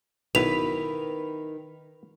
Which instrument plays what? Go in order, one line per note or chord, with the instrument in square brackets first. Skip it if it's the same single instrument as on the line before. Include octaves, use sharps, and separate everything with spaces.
[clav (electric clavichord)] B1 [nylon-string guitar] D#3 E4 [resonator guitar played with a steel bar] B4 [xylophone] F7